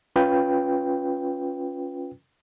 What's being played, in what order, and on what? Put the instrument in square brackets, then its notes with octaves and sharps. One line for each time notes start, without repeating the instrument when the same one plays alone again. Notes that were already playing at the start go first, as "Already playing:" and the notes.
[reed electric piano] C#4 F4 B4 G5